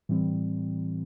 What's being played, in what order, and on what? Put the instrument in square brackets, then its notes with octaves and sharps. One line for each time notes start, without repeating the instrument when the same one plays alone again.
[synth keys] A2 E3 G3 C4